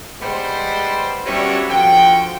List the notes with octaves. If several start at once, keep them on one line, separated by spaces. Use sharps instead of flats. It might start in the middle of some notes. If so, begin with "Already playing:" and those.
G3 G#3 B3 C5
F#3 G3 B3 C#4 D4 E4
D3 F3 F#4 G5